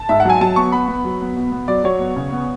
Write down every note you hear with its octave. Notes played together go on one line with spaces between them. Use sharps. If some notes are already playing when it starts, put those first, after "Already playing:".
Already playing: A5
G#2 E5
F#5
F#3 G#5
F#3 A5
B3 C#6
B3 B5
B3
F#3
B3
B2
B3
F#3 D5
F#3 C#5
B3
C#3
B3